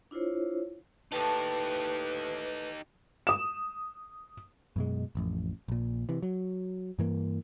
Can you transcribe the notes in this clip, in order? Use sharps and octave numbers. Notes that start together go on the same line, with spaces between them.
D4 E4 F4 C5 C#5
A2 D#4 G4 B4 A5
D#6 E7
F#2 B2 G#3
E1 A1 F2
A#1 A#2
C3 E3
F#3
G2 E3 A#3